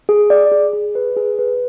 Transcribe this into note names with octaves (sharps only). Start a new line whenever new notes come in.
G#4
D5
G#4
G#4
B4
G#4
B4